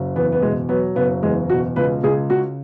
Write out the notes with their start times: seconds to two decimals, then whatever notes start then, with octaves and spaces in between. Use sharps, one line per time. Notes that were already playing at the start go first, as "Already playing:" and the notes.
Already playing: F#1 F#3
0.15 E2 B3
0.32 B3
0.42 B2 G#3
0.69 F#3 B3
0.95 F#1 B3
1.23 E2 G#3
1.50 B2 F#4
1.76 C#2 B4
2.03 C#2 G#4
2.30 C#3 F#4